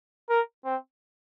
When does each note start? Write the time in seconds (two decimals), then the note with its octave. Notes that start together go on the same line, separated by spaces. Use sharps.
0.30 A#4
0.65 C4